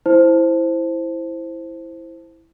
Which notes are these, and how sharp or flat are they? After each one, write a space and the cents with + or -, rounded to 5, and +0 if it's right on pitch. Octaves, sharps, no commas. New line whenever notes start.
E4 +0 C5 +0 A5 +0